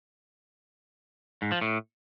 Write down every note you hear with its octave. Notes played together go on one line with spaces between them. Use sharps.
G#2
F3
A2